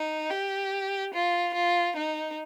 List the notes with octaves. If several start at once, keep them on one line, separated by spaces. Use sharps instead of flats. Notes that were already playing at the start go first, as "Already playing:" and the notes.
Already playing: D#4
G4
F4
F4
D#4